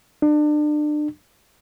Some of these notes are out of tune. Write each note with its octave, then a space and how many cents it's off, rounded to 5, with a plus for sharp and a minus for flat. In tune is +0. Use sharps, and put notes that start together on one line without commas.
D4 +30